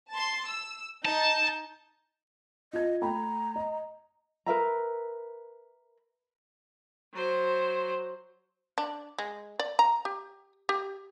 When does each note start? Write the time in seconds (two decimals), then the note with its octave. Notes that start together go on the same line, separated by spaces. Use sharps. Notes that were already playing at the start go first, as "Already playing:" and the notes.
0.11 A5 C6
0.45 E6
1.05 D#4 A5 G6
2.73 F4 D#5 G#6
3.02 A3 G5 A#5 B5
3.56 D#5
4.46 A#4 B4 E5 A#5
7.13 F#3 C5
8.78 D4
9.19 G#3
9.59 D5
9.79 A#5
10.05 G4
10.69 G4